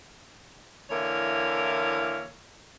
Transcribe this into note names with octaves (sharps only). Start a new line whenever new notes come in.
D3 E3 A#3 E4 A#4 C#5